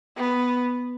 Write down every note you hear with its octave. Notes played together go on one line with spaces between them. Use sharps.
B3